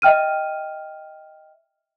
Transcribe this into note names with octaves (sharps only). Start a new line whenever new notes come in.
D#5 E5 G5 F6 D#7